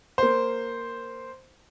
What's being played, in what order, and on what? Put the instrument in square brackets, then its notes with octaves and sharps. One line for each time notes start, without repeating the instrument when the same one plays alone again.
[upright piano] A#3 C5